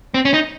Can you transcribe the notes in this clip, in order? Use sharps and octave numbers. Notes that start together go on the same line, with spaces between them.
C4
C#4
D#4